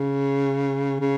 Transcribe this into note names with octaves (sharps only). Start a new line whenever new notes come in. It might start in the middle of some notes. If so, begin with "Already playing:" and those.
Already playing: C#3
C#3